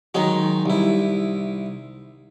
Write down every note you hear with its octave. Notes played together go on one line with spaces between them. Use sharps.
D#3 F#3 G#3 D#4
C2 E4